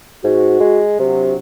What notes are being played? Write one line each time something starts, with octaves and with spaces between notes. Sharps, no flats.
G#2 F#4
G#3
C3 F#3 D4